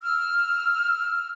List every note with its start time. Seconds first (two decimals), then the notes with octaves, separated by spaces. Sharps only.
0.02 E6 F6